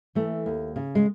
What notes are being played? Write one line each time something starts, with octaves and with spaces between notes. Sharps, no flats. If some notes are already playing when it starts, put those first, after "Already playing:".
E3 A3
D#2
C#3
G#3